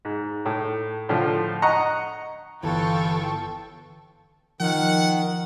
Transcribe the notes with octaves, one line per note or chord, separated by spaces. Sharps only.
G#2
A2
A2 D3 F3
D#5 F#5 A#5 C#6
G1 E3 F4 A4 G5 C#6
D#3 F3 F#5